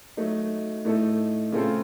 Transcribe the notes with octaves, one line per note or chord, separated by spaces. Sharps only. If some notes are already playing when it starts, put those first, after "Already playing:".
F#3 A3 D#4
A2 A3 D#4 A4
C#3 A3 C4 F4 A4